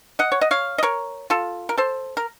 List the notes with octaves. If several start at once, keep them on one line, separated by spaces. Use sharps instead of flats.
D#5 F#5
C#5
D#5
C#5 F5
D#5
A#4 C#5
F4 A4
A#4
A4 C5
A#4